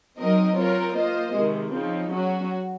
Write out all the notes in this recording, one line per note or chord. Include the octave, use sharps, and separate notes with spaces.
F#3 C4 D#4 A#4 D#5
C4 F4 A#4 C#5
A#3 F4 C5 D#5
C3 D#3 G#3
C#3 F3 C4 D#4
F#3 C#4 F#4